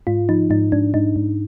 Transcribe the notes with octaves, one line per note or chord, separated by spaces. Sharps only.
G#2 F4
F3 D#4
G#2 D#4
G#2 D4
G#2 D#4
G#2